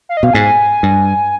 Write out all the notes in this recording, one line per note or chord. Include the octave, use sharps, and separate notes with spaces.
F5
D#5
B2 F5
G#2 G#5
G2